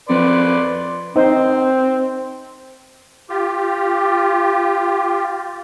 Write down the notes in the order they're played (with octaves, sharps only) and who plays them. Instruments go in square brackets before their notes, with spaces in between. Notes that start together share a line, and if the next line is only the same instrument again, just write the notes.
[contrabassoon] F2 [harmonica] B4 D5 C6
[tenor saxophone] C4 [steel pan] D#4 C5
[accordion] F4 G4